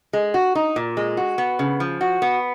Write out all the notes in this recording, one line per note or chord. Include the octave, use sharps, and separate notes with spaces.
G#3
F#4
D#4
A#2
G#3
F#4
B3
C#3
F3
F#4
B3